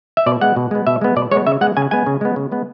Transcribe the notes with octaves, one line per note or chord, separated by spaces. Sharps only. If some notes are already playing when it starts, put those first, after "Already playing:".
E5
B2 D5
G#3 B3 F#5
B2
G#3 B3
B2 E5
G#3 B3
B2 D5
G#3 B3 C#5
C#3 E5
G#3 B3 F#5
C#3 G#5
G#3 B3 G#5
C#3
G#3 B3
C#3
G#3 B3